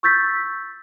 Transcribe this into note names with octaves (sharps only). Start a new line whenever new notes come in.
C#6 E6 G6 A6 B6